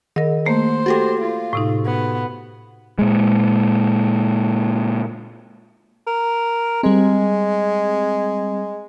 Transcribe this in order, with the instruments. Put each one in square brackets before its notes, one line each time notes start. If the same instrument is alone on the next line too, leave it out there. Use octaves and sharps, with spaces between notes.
[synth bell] D#3 [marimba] A#4 D#5
[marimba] A3 A#3 [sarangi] C5
[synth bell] F#4 G4 A4 [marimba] F#5 G5
[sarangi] F4
[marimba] A2 C3 D#4
[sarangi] B3
[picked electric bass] A#2 G#3
[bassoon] A#4
[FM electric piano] G3 C4 [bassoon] G#3